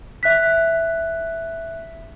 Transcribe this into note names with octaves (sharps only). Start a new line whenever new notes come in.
E5 F#6 B6